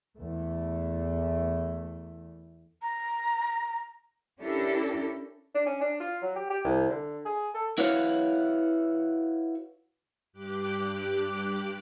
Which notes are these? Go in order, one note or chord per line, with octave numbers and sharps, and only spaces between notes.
E2 A3
A#5
C#4 D4 E4 G4 A4 A#4
D4
C#4
D4
F4
F#3
G4
G4
C2
D3
G#4
A4
E4 F#4 B4 C#5 F5
G2 G4 D6 F#6